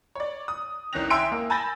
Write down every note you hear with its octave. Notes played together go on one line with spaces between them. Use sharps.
C#5 D5
D#6
C2 D#3 C#4 F#6 A#6 F7
E5 G5 G#5 C6 E6 D7
A#3
G#5 A5 B5 G6 A6 A#6